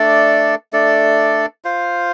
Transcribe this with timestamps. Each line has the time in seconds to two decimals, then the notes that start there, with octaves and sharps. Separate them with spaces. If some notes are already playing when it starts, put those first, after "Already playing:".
Already playing: A3 D4 A4 D5
0.73 A3 D4 A4 D5
1.65 F4 C5 F5